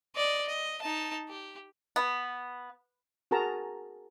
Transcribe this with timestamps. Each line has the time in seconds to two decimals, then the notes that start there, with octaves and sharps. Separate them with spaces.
0.16 D5 D#5
0.47 D#5
0.82 D#4 A5
1.29 G4
1.96 B3
3.31 F#4 G#4 A#4 A5 A#5